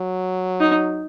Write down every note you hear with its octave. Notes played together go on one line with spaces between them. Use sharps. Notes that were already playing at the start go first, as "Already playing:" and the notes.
Already playing: F#3
D#4